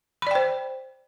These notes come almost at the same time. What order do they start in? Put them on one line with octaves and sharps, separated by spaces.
B5 D5 G5 C5